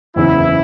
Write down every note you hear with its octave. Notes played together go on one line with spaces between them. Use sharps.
F#1 E2 C#3 E3 E4